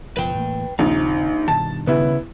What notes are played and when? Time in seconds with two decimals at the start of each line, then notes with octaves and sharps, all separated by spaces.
0.17 F#1 B2 F3 B4 G5
0.35 A2 E3 A#3
0.79 A#1 D#2 C#3 C4 D#4
1.48 G2 B2 D#3 A5
1.87 C#3 B3 E4